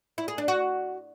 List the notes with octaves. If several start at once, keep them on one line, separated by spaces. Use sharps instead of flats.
E4
G#4
D4
F#4